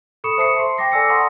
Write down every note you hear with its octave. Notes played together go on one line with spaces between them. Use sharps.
A4 B5 C#6 D#6 C#7 E7
C5 E5 A5 D#6 C7 C#7
C6
G5 A5 D6 A#6 C7
A4 D5 G#5 E6 A#6 C#7
F#5 A#5 C6 C#6 D#6